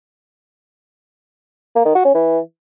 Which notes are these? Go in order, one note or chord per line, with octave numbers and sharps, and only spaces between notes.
A#3
D#3
F#4
C#4
E3